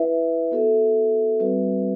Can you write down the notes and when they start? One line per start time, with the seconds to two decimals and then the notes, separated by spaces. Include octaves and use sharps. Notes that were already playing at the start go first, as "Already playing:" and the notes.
Already playing: E4 B4 E5
0.52 B3 F#4 A4 E5
1.40 G3 C4 F#4 B4 E5